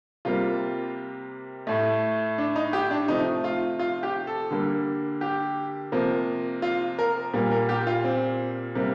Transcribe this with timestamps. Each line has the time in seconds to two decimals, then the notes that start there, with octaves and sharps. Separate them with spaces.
0.25 C3 G3 A#3 F4
1.67 A2 A3
2.38 D4
2.56 D#4
2.73 G4
2.91 D4
3.08 C3 F3 A3 D#4
3.44 F4
3.79 F4
4.03 G4
4.27 A4
4.51 D3 G3 A#3
5.21 G4
5.92 C3 F3 A#3
6.62 F4
6.99 A#4
7.34 A#2 G3 A#3
7.51 A#4
7.69 G4
7.87 F4
8.04 C4
8.75 C3 G3 A#3